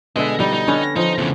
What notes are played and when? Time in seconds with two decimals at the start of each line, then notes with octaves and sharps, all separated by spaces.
0.16 B2 D3 G#4 D#5 E5
0.40 G3 D#4
0.54 D#4
0.67 D3 B3 C#4
0.96 F3 D#4
1.18 E2 C#3